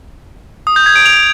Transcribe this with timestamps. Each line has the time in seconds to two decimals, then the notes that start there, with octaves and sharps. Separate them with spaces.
0.67 D#6
0.76 G6
0.86 G#6
0.96 D7
1.05 F7